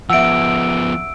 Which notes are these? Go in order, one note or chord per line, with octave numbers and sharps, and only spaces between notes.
F3 B3 E5 F#5 E6 D7